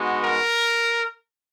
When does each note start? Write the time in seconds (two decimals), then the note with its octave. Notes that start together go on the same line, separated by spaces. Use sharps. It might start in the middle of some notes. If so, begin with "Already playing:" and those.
Already playing: G#3 B3 D#4 F#4
0.23 A#4